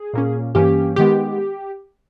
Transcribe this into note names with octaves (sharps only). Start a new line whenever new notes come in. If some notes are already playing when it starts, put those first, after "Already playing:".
Already playing: G#4
A#2 A#3 C#4
G2 E3 A#3 C#4 G4
D#3 G#3 B3 G4